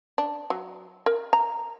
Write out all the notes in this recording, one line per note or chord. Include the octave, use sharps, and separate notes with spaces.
D4
F#3
A#4
A#5